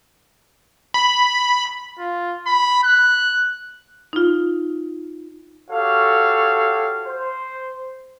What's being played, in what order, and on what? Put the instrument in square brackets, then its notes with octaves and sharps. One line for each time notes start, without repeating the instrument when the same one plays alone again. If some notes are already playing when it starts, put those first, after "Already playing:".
[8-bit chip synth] B5
[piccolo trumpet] F4
B5
F#6
[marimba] D#4 F4
[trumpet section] F#4 G4 A4 C#5 F5
C5